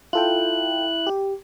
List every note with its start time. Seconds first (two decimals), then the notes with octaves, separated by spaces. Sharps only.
0.13 E4 F4 A4 G5 F#6
1.07 G4